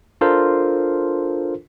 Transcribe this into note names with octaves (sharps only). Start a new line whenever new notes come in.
D4 F4 A4 A#4 C5